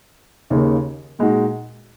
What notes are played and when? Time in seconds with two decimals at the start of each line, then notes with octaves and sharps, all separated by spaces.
0.50 D#2 C#3 A#3
1.19 A#2 G#3 D#4 F#4